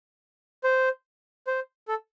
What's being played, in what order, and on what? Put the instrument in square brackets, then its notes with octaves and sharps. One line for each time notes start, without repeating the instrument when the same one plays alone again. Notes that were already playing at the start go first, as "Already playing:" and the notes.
[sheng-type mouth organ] C5
C5
A4